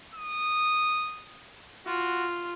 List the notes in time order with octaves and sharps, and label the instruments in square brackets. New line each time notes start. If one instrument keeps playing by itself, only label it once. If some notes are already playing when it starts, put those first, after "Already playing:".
[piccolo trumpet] D#6
[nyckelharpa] F4 [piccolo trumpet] F#4